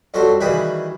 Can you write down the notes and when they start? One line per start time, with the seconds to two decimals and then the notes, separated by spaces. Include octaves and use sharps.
0.14 F2 F#3 G3 A4 C5 C#6
0.40 D#3 E3 G3 F#4 G#4 B4